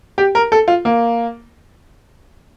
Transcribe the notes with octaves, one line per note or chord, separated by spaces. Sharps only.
G4
A#4
A4
F4
A#3